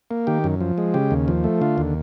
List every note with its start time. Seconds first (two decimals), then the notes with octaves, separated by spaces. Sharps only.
0.11 A#3
0.27 D#3 G4
0.44 F#2
0.61 F3
0.78 G#3
0.94 C#3 G4
1.11 D#2
1.28 F3
1.44 A3
1.61 D3 F4
1.78 D#2